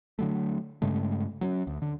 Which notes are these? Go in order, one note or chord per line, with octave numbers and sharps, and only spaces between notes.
D3 F#3 A3
G2 C#3 G#3 A3
F#3 C4 C#4
D2
D3